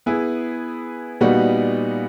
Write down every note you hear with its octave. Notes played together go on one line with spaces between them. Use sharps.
B3 E4 G#4 B4
A#2 G3 B3 D#4 F#4